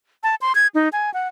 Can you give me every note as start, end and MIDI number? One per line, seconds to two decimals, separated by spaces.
0.23 0.35 81
0.41 0.53 84
0.55 0.67 92
0.75 0.89 63
0.93 1.12 80
1.14 1.28 78